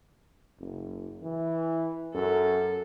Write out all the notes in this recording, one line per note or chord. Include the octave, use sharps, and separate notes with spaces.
F#1
E3
F#2 A4